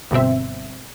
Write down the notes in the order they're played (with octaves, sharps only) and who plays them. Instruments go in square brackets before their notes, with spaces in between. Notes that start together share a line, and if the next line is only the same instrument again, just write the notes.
[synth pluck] G1 G2 B2 C4 E5